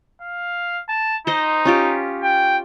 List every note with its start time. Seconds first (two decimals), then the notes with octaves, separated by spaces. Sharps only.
0.22 F5
0.89 A5
1.27 D#4 C5 D#5
1.65 C#4 F4 G4
2.23 G5